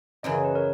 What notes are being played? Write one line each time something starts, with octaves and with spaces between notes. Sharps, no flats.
F#2 C#3 E3 D#5
C#5
B4
A#4 C#5